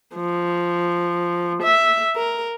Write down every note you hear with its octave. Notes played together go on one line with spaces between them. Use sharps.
F3
E5
A#4